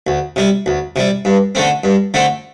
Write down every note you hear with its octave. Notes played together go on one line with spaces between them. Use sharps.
D2
C3 G3
D2
C3 G3
G2
D3 A3 C4
G2
D3 A3 C4